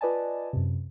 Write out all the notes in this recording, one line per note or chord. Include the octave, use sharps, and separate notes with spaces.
F4 B4 D5 D#5 G#5 A5
F#2 C3